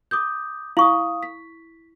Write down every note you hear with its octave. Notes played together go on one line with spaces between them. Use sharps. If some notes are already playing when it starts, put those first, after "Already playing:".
D6 D#6 G6
E4 F5 C#6 D#6
B6